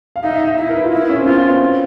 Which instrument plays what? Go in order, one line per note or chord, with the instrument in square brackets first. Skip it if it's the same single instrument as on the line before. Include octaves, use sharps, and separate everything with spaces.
[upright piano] F5
[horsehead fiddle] D#4 [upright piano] E5
[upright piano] E5
E5
[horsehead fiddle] E4 [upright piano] E5
[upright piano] A#4
B4
F4
[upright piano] D#4 [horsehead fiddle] E4
[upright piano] C#4
C4
[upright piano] B3 [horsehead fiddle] F4
[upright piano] C4
B3
C4